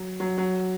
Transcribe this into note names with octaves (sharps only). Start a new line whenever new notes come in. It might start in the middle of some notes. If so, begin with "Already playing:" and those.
Already playing: F#3
F#3
F#3